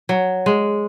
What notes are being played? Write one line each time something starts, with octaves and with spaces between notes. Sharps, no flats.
F#3
G#3